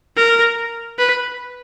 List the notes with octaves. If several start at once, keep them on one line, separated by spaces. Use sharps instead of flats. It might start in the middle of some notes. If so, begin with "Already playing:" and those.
A#4
B4